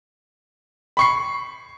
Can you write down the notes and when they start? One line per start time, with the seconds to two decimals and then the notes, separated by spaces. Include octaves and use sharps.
0.97 B5 C#6 C7